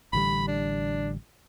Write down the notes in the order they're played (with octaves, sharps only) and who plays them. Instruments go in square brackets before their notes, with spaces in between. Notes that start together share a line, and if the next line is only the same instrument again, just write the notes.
[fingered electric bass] A1 D3 G3 [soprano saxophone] B5
[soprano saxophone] D4